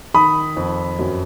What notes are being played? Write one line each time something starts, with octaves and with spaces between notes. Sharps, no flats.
D#3 B5 D#6
F2
F#2